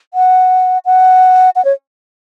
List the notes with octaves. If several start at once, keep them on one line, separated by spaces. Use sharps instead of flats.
F#5
F#5
F#5
C#5